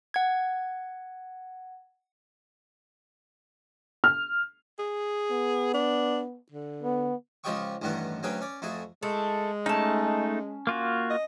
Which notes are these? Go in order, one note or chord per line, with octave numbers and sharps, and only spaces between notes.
F#5 G#6
F6
G#4
B3
D4
D3
B3
C#2 F3 G4 D#5 G5 C#6
A1 G2 D#3 G3 B3 F#5
D2 F#3 C#4 G#4 B4 G5
C#4 D5
F2 A3 F#4 G#4
G#3 A3 E4
A3 C#4 D#4 A5
A#3 F4 F#4
D#5